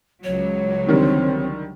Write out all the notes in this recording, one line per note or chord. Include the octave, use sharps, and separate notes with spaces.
C#2 F#3 C#5
D3 D#3 G3 C4